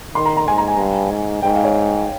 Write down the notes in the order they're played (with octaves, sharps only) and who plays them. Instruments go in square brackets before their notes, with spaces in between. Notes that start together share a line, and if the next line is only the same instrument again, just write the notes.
[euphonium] D#3 [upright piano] C6
[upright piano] A#5
A#5
[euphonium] G#2 [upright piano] G#5
[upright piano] A#5
G#5
[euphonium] G2
G#2
[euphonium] G#2 [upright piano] G5
[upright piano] F5
C#5